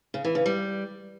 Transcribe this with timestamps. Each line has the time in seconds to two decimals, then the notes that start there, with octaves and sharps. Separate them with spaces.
0.14 C#3
0.25 E3
0.35 C#3
0.46 G3